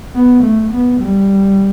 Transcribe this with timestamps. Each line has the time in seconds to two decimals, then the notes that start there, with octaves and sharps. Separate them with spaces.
0.15 B3
0.44 A3
0.72 B3
1.01 G3